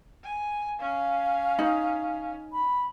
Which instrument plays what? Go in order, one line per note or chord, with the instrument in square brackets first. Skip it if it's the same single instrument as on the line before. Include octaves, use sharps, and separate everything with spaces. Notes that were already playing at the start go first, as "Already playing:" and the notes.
[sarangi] G#5
[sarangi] C#4 [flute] F5
[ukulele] D#4
[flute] B5